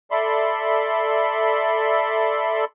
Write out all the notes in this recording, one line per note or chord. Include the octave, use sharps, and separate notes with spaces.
A4 D5 E5 B5 C6